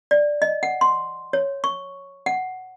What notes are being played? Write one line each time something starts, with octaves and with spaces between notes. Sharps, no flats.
D5
D#5
F#5
C6
C#5
C#6
F#5